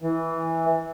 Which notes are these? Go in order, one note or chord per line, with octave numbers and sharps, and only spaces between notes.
E3